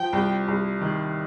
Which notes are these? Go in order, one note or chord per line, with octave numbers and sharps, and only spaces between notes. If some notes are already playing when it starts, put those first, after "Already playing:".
Already playing: F3 G5
C2
C2
D#3